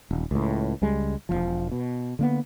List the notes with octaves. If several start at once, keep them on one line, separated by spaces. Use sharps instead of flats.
D#1
C#2 A2
C#2 G3 G#3
E1 C2 F3
B2
D3 A#3 B3